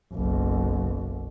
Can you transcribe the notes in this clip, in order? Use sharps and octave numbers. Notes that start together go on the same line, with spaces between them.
F#1 B1